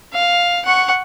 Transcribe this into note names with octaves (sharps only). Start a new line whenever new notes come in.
F5
F#5 C#6